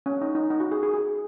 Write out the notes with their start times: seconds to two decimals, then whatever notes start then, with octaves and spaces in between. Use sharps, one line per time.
0.06 C#4
0.21 D#4
0.35 D#4
0.50 D#4
0.60 F#4
0.72 G#4
0.83 G#4
0.94 G#4